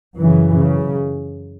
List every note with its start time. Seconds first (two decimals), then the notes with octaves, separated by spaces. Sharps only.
0.19 F#2 C#3 E3
0.57 C#3